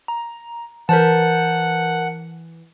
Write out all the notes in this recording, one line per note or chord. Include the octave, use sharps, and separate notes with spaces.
A#5
E3 A#4 C5 F#5 A5